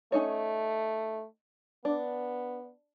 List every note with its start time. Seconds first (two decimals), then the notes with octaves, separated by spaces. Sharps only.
0.12 A3 C#4 D#4 C#5
1.85 B3 D4